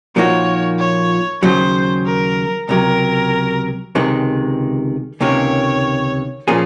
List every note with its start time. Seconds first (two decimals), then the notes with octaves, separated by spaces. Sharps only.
0.16 A#2 F3 A#3 D#4 F#4 C#5
0.79 C#5
1.42 D#2 C#3 F#3 C5
2.06 A#4
2.68 C#2 C3 F#3 A#4
3.95 C#2 C3 D#3 G#3
5.21 C#2 C3 D#3 A#3 C#4 C#5
6.48 A#2 F3 A#3 C#4 G#4